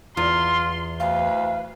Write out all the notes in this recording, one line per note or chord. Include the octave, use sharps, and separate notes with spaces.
E2 F4 C6
D2 B4 F5